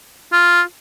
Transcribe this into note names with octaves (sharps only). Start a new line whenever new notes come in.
F4